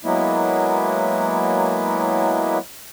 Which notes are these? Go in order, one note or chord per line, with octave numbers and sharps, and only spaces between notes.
F#3 G#3 A#3 B3 E4